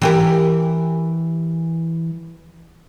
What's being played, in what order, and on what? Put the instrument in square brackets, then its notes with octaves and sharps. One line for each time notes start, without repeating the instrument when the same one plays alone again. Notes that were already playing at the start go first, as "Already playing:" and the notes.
[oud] E3 G4 A#4